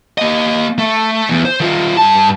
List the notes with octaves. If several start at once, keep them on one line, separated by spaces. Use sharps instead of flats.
A#3 D#5
A3
E2
C5
D#3 F4
G2 A5